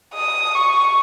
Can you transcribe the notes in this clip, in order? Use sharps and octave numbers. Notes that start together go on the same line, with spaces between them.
D#6
C#6